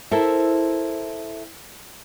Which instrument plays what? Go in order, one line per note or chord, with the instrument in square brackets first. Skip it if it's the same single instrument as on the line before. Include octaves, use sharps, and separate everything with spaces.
[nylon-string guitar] E4 A4 A#4 C5 E5